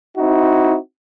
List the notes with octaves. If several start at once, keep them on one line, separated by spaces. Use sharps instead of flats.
C4 D#4 E4 F#4